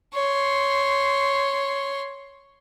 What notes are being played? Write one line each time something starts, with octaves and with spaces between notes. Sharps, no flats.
C#5 C6